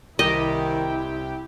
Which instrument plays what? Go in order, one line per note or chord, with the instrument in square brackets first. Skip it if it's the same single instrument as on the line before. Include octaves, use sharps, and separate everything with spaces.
[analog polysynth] C2 G4 [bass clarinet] D#3 [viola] E4 [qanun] D#5